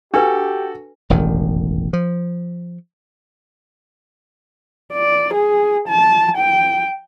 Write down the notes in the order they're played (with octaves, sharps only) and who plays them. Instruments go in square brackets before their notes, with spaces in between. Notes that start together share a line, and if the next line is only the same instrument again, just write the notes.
[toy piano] D4 B4 [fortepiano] F#4 A4 [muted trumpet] G4
[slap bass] E1 A1 F2 D#3
F3
[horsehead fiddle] D5
G#4
A5
G5